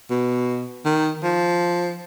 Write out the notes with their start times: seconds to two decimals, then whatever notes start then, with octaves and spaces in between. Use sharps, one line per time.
0.11 B2
0.85 D#3
1.23 F3